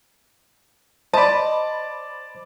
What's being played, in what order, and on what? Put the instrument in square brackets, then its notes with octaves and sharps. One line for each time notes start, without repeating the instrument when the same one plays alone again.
[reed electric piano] C5 B5 [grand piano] D5 A5 [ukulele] D#5